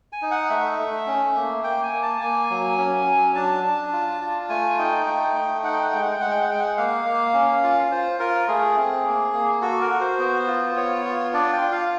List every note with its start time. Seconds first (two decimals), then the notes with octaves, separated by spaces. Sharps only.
0.13 G#5
0.22 D#4
0.31 F#5
0.50 A3 E5
0.79 A3
1.07 C#4
1.36 A#3
1.64 A#3 G5
1.83 G#5
1.93 A#3
2.02 A5
2.21 A#3 G#5
2.50 F#3
2.78 C#4
3.06 F#3
3.35 D4 A5
3.63 D4
3.92 F4
4.21 F4
4.49 A3 G#5
4.78 D#4 G5
5.06 A3 G5
5.35 A3
5.63 D#4 F#5
5.73 G5
5.82 F#5
5.92 G#3 G5
6.02 F#5
6.12 G5
6.20 G#3 F#5
6.31 G5
6.41 F#5
6.49 G#3 G5
6.60 F#5
6.77 A#3 F5
7.05 A#3
7.34 C#4
7.63 F4
7.91 F4 C5
8.19 F4 A#4
8.48 A3 G#4
8.77 C4
9.05 A#3
9.33 A#3
9.62 F#4 A4
9.81 A#4
9.91 F#4
10.01 C5
10.19 B3
10.47 F4
10.76 B3 C#5
11.05 F4
11.33 D4 D5
11.53 G5
11.61 F4
11.72 F5